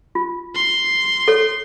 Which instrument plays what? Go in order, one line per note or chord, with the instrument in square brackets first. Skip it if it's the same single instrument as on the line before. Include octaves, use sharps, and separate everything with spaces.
[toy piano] F4
[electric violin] C6
[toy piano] A4 C#5